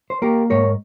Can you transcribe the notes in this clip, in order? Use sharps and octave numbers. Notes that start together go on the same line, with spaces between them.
C5
A#3 G4 A#4
G#2 A#4 C#5